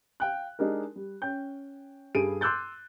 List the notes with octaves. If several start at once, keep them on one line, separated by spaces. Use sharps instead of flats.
F5 G5 F#6
G#3 D4 D#4 G4 A#4
G3
C#4 G5 G6
G2 G3 G#4 A4 D7 D#7
C6 D6 E6 F#6 G6 A6